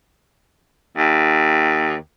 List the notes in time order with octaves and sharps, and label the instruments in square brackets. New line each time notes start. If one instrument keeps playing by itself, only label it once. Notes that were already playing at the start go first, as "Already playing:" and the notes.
[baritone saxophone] D#2